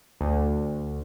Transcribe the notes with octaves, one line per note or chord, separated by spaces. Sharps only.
D2